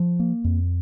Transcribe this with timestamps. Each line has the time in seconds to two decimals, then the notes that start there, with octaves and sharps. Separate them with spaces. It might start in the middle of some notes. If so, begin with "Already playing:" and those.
Already playing: F3
0.20 A#3
0.44 F2